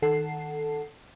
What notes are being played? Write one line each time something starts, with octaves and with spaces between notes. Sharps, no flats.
D#3 A4 F#5 A5 C7